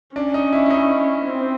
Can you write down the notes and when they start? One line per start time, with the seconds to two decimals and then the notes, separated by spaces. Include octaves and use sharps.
0.16 C#4 D4
0.34 D#4
0.53 E4
0.66 E4
0.70 D#4
1.26 C4